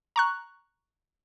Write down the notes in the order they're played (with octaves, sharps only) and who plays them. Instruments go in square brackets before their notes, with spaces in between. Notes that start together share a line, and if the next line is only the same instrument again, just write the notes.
[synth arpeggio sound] A#5 C#6 F#6